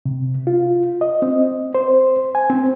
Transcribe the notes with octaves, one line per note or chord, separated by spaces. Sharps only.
C3
F4
D#5
C4
C5
G#5
C4